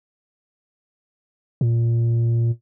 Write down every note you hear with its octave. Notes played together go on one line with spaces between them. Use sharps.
A#2